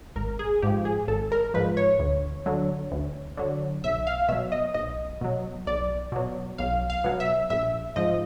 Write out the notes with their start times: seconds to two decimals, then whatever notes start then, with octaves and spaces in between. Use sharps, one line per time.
0.16 G#1 A#4
0.39 G#4
0.62 G#2 F3 G4
0.85 G#4
1.08 G#1 A4
1.32 A#4
1.54 G#2 F3 B4
1.77 C#5
1.99 D2
2.46 D3 F#3
2.92 D2
3.37 D3 F#3
3.84 B1 E5
4.07 F5
4.29 B2 F#3 E5
4.52 D#5
4.74 B1 D#5
5.21 B2 F#3
5.66 B1 D5
6.12 B2 F#3
6.58 B1 F5
6.90 F5
7.04 B2 F#3
7.20 E5
7.50 A#1 E5
7.96 G#2 F3 D#5